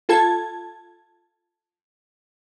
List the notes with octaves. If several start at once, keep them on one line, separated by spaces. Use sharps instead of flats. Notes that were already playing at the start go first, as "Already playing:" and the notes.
F4 A4 A5 G#6